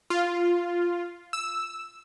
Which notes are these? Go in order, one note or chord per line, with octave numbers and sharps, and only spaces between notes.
F4
E6